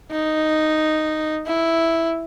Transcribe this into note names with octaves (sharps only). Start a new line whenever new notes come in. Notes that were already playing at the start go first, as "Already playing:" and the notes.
D#4
E4